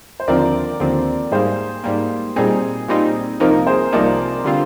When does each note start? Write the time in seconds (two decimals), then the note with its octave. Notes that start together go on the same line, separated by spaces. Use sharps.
0.20 C5
0.28 D#2 D3 F3 C4 A#4 D5
0.80 D#2 D3 F3 C4
1.32 G#2 G3 A#3 G#4 C5
1.84 G#2 G3 A#3
2.36 A#2 G3 C4 D#4 G#4
2.88 A#2 G3 C4 D#4
3.40 C2 C3 F3 A#3 D#4 A#4
3.67 G#4 C5
3.93 C2 C3 F3 A#3 D#4 A#4 D5
4.44 D3 G3 C4 F4